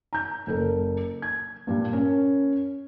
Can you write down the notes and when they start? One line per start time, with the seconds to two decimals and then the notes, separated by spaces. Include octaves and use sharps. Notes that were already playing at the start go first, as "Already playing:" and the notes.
0.13 A#5 G6
0.47 F#1 A4 A#4
1.22 G#6
1.67 G2 A#2 G3
1.92 C#4 A#4